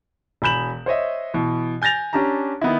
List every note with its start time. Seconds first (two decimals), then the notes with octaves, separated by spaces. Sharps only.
0.42 E1 G#5 B5 G6 E7 F#7
0.86 C5 C#5 D#5 E5
1.34 B2 E3
1.82 G#5 G6 A6 A#6 F7
2.13 C#4 D4 G4 A5 A#5
2.61 D#3 B3 D#4 E4